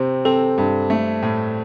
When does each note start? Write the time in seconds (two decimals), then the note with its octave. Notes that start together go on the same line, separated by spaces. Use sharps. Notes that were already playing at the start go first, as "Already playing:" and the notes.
Already playing: C3 C4 C5
0.25 C4 A4
0.58 G2
0.90 A3
1.22 A2